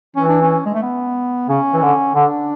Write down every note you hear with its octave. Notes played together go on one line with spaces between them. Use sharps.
E3 C#4
D4
C#4
G#3
A3
B3
C#3 C#4
E3
D3
D3 D4